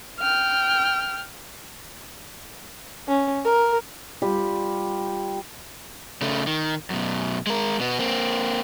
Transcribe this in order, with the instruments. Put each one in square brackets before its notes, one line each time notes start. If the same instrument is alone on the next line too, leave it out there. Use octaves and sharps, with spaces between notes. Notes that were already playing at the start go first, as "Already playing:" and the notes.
[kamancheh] G5 F6
C#4
A#4
[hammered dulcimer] G3 F4 G4
[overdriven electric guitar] C#3 A3
D#3
F#2 B2
G#3 A#4
B2 B3
A#3 C4